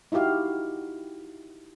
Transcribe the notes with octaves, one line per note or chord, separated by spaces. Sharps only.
D#4 E4 F#4 G4 F5